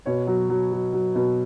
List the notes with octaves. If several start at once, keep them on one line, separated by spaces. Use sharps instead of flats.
B2 C#5
F#3
F#3
F#3
F#3
B2